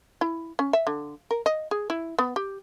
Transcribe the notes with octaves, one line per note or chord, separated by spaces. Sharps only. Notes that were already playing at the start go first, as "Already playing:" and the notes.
E4
C#4
E5
D3
A#4
D#5
G#4
E4
B3
G4